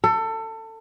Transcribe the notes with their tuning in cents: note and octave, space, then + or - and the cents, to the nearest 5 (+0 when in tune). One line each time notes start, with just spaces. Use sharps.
A4 +25